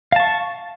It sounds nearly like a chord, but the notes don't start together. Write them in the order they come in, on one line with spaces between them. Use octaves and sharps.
F5 A5 C#6